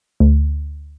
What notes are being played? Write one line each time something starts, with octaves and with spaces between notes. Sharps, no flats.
D2